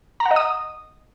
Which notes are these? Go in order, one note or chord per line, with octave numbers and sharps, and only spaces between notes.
A#5
F#5
D#5
D#6